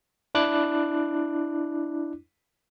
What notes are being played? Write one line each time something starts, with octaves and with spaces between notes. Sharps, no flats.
D4 E4 D6 F#6